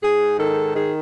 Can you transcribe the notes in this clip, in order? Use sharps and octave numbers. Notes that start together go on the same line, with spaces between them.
G#2 G#4
D#3 A4
D#3 G#4